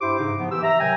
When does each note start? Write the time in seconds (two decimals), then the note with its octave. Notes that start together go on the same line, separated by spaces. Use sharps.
0.01 G2 E4 G4 C5 C6 D6
0.20 G#2 C#3 D#4
0.39 F3 B3
0.51 E3 G4 E6
0.63 E5 A#5
0.80 C3 D#3 F#3 G5 G#5